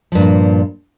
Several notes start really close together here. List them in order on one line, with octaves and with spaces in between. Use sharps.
F3 G2 A#2